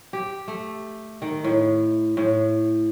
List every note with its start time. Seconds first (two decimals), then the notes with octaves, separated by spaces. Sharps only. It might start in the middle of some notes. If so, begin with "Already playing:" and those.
0.13 G4
0.48 A3
1.22 D#3
1.44 A2
2.17 A2